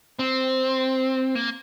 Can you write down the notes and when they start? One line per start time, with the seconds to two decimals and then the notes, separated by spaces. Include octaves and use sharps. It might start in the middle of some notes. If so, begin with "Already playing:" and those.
0.19 C4
1.35 A#3